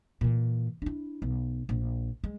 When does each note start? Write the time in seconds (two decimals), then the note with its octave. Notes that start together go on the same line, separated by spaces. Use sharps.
0.21 A#2 E3
0.82 D4 E4
1.22 B1
1.69 A#1
2.24 G#3